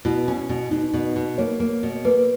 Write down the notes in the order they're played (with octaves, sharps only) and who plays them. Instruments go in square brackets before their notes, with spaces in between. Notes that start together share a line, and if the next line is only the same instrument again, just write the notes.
[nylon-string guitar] B2 [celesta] E4
[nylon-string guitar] C#4
B2
[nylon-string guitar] B2 [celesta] D#4
[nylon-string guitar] B2
B2
[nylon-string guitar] A#3 [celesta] C#5
[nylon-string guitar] A#3
B2
[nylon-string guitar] A#3 [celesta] B4